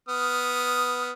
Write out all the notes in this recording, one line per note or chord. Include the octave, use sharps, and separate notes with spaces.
B3 D#6 F6